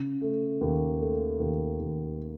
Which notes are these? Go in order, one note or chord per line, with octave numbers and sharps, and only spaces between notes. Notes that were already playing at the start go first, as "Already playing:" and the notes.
Already playing: C#3
A3
D#2
A3
D#2
D#2